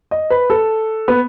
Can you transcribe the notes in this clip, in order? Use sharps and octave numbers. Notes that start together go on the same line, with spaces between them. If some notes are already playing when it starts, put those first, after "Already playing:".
D#5
B4
A4
B3